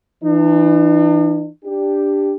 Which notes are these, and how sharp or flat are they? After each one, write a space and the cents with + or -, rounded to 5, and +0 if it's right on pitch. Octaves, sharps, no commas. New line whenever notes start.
E3 +5 D4 +45
D4 +0 G4 +5